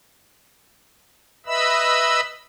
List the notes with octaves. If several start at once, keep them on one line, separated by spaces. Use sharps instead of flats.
B4 D#5 E5 B5 E6